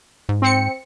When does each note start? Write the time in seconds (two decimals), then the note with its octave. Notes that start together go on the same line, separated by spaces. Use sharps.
0.29 G#2
0.42 C4 C#7